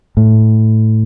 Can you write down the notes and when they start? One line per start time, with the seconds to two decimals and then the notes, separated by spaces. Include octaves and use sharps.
0.17 A2